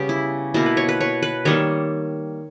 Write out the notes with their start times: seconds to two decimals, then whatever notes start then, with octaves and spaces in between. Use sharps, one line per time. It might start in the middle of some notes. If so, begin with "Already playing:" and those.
Already playing: C#3 G3 B3 G4
0.09 E4
0.54 B2 A#3 E4
0.66 B4
0.77 C#5
0.89 B4
1.01 C#5
1.23 B4
1.45 D#3 G3 A#3 C#5